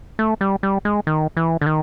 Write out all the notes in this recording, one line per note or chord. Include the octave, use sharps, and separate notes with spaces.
A3
G3
G3
G#3
D#3
E3
D3
D#3